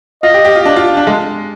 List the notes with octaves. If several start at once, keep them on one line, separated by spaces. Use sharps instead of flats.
F4 D#5
G4
G4
F4
D4
F4
D4
G#3